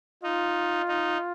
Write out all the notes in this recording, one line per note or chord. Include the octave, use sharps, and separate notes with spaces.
D#4 F4
D#4